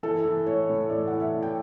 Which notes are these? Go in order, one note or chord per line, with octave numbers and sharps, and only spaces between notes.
E3 A4
E3
A2 C#5
A2
E3 D5
E3 F#5
E5
A2
G5